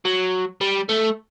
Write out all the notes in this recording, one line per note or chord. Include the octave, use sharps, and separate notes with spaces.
F#3
G3
A3